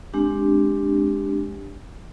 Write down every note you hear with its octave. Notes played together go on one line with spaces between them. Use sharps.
G#3 C4 D4 G4